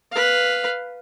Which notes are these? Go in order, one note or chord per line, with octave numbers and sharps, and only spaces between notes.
B4 F5